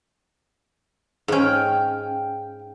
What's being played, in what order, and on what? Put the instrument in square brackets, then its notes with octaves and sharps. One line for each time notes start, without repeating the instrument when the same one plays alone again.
[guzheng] G#2 C#4 [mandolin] F5 G5